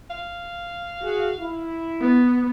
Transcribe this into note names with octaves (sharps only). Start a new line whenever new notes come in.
F5
F#4 G#4
E4
B3